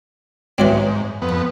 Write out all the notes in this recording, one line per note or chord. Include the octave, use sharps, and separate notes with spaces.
G#2 E3 F#3 C4
F2 B3